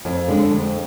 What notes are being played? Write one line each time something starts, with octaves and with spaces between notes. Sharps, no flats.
F2
D3 G#3 D4
F2